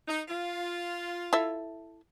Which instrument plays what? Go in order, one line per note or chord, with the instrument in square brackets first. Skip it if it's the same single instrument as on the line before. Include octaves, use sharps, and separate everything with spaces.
[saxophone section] D#4
F4
[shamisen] E4 A4 E5